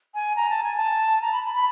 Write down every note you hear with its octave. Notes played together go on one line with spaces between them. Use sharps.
G#5
A#5
A5
G#5
A5
A#5
B5
B5
B5